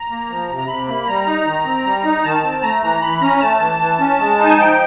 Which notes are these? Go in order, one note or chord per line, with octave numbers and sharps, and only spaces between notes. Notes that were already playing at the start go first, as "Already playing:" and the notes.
Already playing: A#5
A#3
F3
C3
A#5
C3 B5
A#3 B5
G3 A#5
D#4
D#3
C4
G3
D#4
D#3 A5
C4
A3 A#5
E3 A#5
E3 B5
C#4 A#5
A#5
A3 A5
E3
E3
C#4
G#3
D#4
G#5
F3 G5